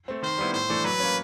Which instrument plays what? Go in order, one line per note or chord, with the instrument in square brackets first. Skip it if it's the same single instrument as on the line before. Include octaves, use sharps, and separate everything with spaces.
[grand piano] A3 C4
[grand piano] D#3 [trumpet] C5
[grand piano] G3 B3 E4
[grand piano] A2 [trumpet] C5
[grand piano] E3 A3 D4
[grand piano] F#3 [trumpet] B4
[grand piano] A#3 C#4